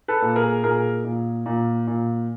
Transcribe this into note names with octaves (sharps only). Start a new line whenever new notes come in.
A4 B4
A#2
G#4 A#4
A#2 G#4 A#4
A#2
A#2
A#2